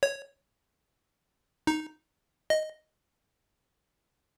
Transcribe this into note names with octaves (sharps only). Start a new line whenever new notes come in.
C#5
D#4
D#5